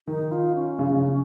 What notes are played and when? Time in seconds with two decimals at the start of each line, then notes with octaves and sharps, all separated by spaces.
0.07 D#3 D#4
0.31 F4
0.55 C#4
0.79 C#3
0.96 C#3